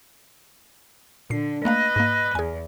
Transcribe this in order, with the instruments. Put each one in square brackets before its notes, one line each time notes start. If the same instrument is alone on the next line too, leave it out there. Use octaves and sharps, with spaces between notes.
[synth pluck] A#2 C7 [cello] D3
[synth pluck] A3 A#3 F5 [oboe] B4 [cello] D#5
[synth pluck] G#2 A#3
[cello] E2 [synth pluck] G#4 G#5